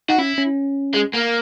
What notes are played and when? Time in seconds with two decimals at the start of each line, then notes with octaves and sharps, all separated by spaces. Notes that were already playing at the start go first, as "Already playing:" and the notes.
0.09 D#4 F#4
0.18 C#4 E4
0.38 C#4
0.94 G#3
1.14 A#3